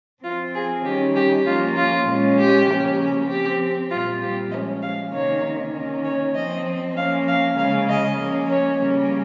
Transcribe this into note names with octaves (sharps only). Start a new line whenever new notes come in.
F3 C4 F4
G#4
D#3 G3 C#4 G4
G4
F3 A#3 C#4 F4
F4
A#2 G#3 C#4
G4
C#3 F3 A#3 C#4
F3 C4 G4
A#2 G3 C4 F4
G4
F3 G#3 C#4 D#5
F5
C3 D#3 A#3 C#4 C#5
D#3 A#3 C#4
C#5
F3 C4 D#5
F3 A#3 C#4 F5
F5
C#3 G#3 C#4 F5
D#5
F3 A#3 C#4
C#5
C#3 G3 A#3 C#4